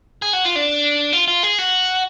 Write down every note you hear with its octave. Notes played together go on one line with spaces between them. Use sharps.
G#4
F#4
F4
D4
F4
F4
G#4
F#4